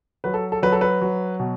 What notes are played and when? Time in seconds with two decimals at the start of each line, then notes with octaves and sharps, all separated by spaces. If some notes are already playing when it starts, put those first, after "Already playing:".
0.24 F#3 B4
0.34 A4
0.52 A4
0.62 F#3 B4
0.72 A4
0.81 B4
1.01 F#3
1.40 B2